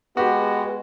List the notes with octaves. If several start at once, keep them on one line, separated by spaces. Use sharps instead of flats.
G#3 B3 F#4 G4